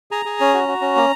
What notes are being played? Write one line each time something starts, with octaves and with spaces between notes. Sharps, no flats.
G#4 A#5
G#4
C#4
F#4
F#4
C#4
A#3